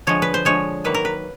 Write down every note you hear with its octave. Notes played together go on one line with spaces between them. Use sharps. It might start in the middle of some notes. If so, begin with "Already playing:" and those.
D3 F3 G#3 C#5
B4
C5
D3 F3 G#3 C#5
D#3 F#3 A#3 B4
A#4
B4